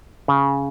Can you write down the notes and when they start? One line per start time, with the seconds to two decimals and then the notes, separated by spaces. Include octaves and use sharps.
0.28 C#3